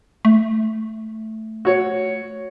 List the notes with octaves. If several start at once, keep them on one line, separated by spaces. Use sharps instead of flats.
A3
F#4 C#5